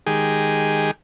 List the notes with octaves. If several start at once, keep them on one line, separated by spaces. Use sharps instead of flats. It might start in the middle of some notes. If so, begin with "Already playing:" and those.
D#3 G#3 G4 G#4